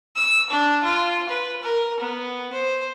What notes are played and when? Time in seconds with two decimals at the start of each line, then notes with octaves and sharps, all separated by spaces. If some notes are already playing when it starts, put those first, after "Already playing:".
0.16 E6
0.50 D4
0.83 F4
1.29 B4
1.63 A#4
2.00 B3
2.52 C5